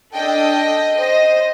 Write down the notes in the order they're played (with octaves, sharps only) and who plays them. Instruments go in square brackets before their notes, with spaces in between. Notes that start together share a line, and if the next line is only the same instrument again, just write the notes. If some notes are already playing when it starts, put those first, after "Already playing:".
[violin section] D4 A4 D#5 G5
C5 D#5